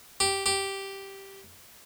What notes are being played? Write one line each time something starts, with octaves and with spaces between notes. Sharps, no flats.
G4
G4